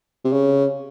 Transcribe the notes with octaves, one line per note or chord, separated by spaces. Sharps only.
C3
C#3